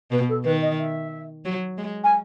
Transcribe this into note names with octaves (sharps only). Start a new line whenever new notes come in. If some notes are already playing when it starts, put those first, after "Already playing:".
B2 B4
A4
D#3 B4
D#5
E5
F#3
G#3
G#5